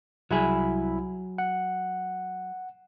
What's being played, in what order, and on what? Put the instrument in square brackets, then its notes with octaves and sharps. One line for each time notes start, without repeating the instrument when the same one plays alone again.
[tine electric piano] C2 E4 B5 [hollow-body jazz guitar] F#3 G#4
[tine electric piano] F#5